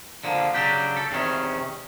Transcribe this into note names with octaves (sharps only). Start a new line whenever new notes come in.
D3 F3 A#3
C#3 F#3 D4 G4
A4
E2 C3 D#3 C#4